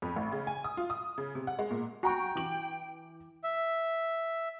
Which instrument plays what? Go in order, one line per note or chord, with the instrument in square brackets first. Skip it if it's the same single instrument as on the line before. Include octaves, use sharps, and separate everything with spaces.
[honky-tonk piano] F2
A1
C#3
G#5
D#6
F4
D#6
C#3
C3
F#5
G#3
A#2
[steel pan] F#4 [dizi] G5 [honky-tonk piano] G#5 A#5 C#6
[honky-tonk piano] E3 D6 F#7
[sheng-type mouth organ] E5